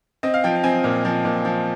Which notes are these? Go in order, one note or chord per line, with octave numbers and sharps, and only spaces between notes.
C4 D#5
F5
F3 G5
C4 G#5
A#2
F3
A#2
F3